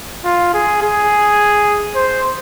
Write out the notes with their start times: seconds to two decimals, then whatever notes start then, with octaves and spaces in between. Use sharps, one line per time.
0.25 F4
0.54 G#4
0.82 G#4
1.96 C5